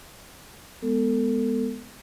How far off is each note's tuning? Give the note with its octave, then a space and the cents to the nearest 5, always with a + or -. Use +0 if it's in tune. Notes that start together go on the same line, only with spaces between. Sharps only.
G#3 +0 B3 +0 A4 +30